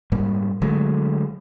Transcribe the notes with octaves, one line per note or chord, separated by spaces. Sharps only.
G#2 G3 A#3
D3 F#3 G#3 A3